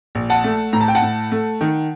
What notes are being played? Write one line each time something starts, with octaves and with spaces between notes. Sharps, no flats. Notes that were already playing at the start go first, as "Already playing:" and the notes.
A#1
F#5 A5
A3
A2 A#5
A5
G5
F#5 A5
A2
A3
D#3